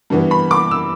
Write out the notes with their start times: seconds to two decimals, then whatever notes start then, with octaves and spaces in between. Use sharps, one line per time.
0.10 G2 E3 B3
0.31 B5
0.51 D6
0.71 E6